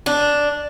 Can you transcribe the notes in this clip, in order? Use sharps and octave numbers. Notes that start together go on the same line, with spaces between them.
D4